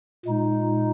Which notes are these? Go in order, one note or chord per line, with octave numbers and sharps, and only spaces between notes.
A#2 G#3 D#4